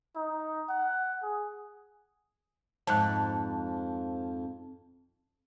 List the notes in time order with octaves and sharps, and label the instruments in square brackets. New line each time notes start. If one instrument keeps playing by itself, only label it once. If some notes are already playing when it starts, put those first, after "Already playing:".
[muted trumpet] D#4
F#5
G#4
[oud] F2 G#2 [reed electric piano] A5 F#6